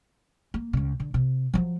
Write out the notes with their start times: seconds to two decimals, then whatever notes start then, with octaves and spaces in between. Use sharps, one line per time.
0.54 A#3
0.73 C#2 C#3
1.00 D3
1.14 C3
1.53 F3 F#3